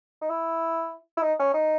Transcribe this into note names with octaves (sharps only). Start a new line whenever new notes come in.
D#4
E4
E4
D#4
C#4
D#4